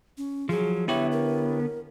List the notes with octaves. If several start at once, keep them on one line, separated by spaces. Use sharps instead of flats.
C#4
F3 F#3 G#4
D3 B3 E4 G4 C#5 E5
A#4